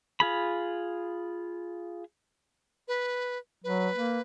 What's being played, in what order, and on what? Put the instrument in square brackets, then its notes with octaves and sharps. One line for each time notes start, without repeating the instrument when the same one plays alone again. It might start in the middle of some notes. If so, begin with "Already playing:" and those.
[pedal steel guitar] F4 G#4 B5
[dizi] B4
[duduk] F#3 [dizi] B4
[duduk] A#3